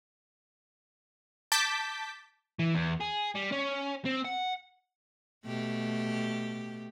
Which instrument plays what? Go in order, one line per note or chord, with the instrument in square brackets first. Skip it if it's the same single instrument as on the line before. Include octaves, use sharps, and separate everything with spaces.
[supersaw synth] A5 D6 G6 B6
[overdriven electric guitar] E3
E2
G#4
G3
C#4
C4
F#5
[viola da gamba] B2 A3 G4